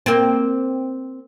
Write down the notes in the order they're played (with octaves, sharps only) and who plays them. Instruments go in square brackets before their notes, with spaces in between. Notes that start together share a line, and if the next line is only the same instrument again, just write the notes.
[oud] A#3 C4